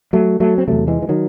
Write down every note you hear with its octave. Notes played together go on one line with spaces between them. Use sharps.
F#3 A3
F#3 A3
C4
E2 C3 F#3 A3
E3 G#3
E3
D#3 F#3